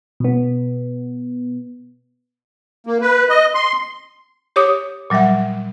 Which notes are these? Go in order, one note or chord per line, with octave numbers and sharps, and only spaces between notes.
B2 B3
A#3
B4
D#5
C6
G4 C#5 D6 D#6
A#2 F#3 G3 E5 F#5